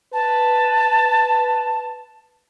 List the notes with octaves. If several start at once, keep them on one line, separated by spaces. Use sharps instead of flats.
B4 A5